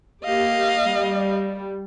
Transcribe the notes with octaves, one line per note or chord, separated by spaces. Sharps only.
A#3 G4 D#5 F5
G3